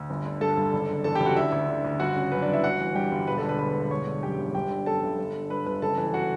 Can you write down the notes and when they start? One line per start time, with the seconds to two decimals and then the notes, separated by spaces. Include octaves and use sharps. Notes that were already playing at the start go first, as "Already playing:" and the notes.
Already playing: D2
0.10 G1
0.25 D3
0.41 G2 A4 A5
0.57 G1
0.73 F#1
0.89 D3
1.04 E2 A4 A5
1.15 G4 G5
1.20 F#1
1.26 F#4 F#5
1.36 D3 E4 E5
1.52 D2
1.69 D3
1.85 D2
2.00 G1 F#4 F#5
2.16 C#3
2.32 F#2 B4
2.42 D4 D5
2.48 G1
2.53 E4 E5
2.64 G1 F#4 F#5
2.79 E3
2.95 G2 G4 G5
3.11 G1
3.27 E1 B4 B5
3.38 A4 A5
3.43 D3
3.49 B4 B5
3.59 D2 B4 B5
3.76 E1
3.91 G1 C#5 C#6
4.07 D3
4.23 F#2 G4 G5
4.39 G1
4.54 G1 G4 G5
4.70 D3
4.86 F#2 A4 A5
5.03 G1
5.18 G1
5.34 D3
5.50 G2 B4 B5
5.66 G1 B4 B5
5.82 F#1 A4 A5
5.98 E3
6.14 F#4 F#5